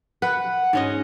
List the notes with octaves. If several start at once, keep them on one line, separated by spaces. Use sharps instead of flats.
B4 F#5
G#2 C#4 D#5